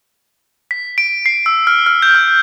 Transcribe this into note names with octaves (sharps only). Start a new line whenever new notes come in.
B6
D7
C7
E6
F6
F6
G6
F6